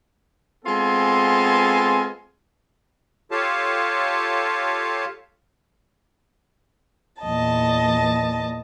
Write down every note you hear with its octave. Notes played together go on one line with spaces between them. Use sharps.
G#3 B3 C4 F4 A4 G#5
F4 G4 A4 C#5 F5 A5
E2 A#2 D#5 A5